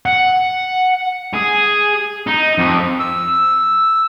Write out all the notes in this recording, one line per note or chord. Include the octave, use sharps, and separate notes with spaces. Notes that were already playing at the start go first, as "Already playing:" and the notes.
F#5
G#4
D#4
F2
E6